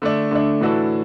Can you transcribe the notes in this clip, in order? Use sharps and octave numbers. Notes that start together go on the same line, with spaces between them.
D3 A3 D4
D3 A3 D4
A2 E3 D4 F#4 A4